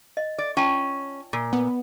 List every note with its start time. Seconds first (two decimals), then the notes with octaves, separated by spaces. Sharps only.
0.17 D#5
0.38 D5
0.57 C#4 F4 G5 A5
1.33 A#2
1.53 B3